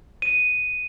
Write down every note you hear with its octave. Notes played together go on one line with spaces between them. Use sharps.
D#7